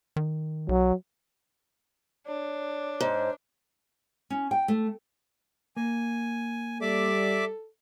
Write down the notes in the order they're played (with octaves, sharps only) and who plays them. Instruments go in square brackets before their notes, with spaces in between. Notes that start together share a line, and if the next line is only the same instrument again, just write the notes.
[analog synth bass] D#3
[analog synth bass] B1 [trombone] F#3
[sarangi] D4 [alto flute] C#5
[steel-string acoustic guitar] G#2 [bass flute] C5
[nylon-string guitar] C#4
G5
A3
[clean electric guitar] A#3 [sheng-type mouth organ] G#5
[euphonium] G3 [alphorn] A4 [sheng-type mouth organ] D5 E5 D6